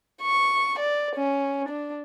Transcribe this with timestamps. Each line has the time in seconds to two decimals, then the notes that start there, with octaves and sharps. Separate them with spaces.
0.22 C#6
0.79 D5
1.16 C#4
1.69 D4